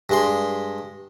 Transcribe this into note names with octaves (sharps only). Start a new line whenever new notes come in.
G2 G#3 C6